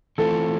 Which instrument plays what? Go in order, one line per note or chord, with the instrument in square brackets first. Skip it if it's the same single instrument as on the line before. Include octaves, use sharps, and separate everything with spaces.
[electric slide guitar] E3 A3 C4 F4 [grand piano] A4